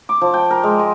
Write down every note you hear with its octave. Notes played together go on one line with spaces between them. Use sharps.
D6
F3
G5
A#4
G#3
G#5